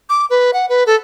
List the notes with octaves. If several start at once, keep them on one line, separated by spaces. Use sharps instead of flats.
D6
B4
F#5
B4
A4